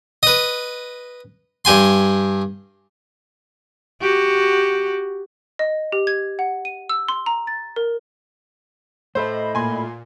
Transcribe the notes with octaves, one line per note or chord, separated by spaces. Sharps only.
B4 D#5
G2 G4 G#5 C6
F#4 G4
D#5
G4
G#6
F#5
D#7
E6
C6
A#5
A6
A#4
A2 A4 C5 D#5 E5 B5
A#2 G#5 C6